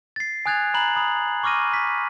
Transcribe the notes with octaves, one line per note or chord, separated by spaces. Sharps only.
A6 C7
G#5 D#6 F#6 G#6 A6 F7
A#5 B5 F#6 F#7
B5 D#6
C#6 D6 F6 A#6 D#7
B6